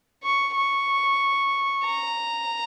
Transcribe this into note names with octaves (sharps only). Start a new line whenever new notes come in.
C#6
C#6
A#5